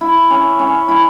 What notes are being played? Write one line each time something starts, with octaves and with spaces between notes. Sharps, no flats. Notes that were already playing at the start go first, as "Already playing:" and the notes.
E4
C#4
C#4
E4